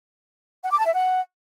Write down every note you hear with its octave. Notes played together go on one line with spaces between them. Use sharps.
F#5
D6
A5
E5
F#5